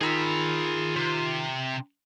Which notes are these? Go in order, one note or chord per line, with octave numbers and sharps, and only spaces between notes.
D#3 F4 G#4 A#5 B5 E6
C3